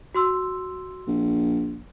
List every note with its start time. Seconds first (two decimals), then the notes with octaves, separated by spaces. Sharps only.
0.15 F#4 C6 E6
1.07 A#1